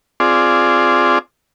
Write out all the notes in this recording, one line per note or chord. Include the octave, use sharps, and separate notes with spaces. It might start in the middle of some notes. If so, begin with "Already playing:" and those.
C4 F4 G#4 D5